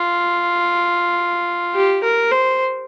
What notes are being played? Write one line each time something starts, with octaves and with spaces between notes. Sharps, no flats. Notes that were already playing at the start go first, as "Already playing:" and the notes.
Already playing: F4
G4
A#4
C5